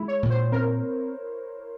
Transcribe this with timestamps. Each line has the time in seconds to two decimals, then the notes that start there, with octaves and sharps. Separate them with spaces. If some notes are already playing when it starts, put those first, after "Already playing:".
Already playing: G#3 E4
0.08 C#5
0.23 A#2
0.30 C5
0.52 C4 A#4